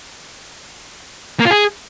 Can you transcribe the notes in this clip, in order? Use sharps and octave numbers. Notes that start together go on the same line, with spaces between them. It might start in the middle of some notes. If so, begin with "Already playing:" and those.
A#3
F4
G#4